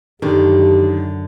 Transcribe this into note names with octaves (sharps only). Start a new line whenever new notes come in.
F#2 D3 D#3 G4